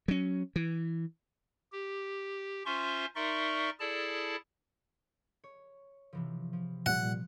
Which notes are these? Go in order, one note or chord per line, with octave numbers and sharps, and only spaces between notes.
F#3 C#4
E3
G4
C#4 F4 C5 E5 C6 C#6
D#4 A#4 D5 E5 C6 C#6
E4 G#4 A4 D5 A5
C#5
C3 E3 F3
F3
A#2 G3 F#5